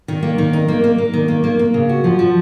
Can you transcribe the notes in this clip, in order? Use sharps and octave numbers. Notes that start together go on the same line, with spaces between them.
D#3
A#3
D#3
D#4
A#3
A#3
A#3
D#3
A#3
A#3
A#3
C#3
F#4
F3
F3